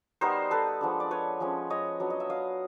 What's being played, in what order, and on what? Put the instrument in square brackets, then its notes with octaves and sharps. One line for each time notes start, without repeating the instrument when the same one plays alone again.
[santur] G3 B3 D#4 A#4 C5
A4 B4
F3 G#3 B3 D4
D5
B4 C#5
F3 G#3 C#4
C#5 D#5
F#3 B3 D4
D#5
E5
D#5 F5